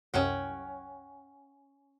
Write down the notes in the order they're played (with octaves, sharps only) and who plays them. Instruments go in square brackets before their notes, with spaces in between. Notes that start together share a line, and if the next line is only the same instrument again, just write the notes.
[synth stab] C2 F#2 [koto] C#4 F#5 G5